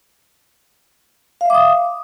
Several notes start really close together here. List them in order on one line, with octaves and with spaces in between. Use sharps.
F5 E5 D6 D#6